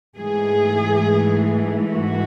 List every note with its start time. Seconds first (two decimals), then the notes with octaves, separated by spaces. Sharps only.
0.17 G#2 E3 A3 G#4
1.90 F#4